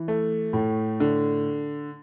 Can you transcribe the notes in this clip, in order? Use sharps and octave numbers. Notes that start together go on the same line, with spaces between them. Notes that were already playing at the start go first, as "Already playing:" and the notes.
Already playing: E3
A3
A2
D3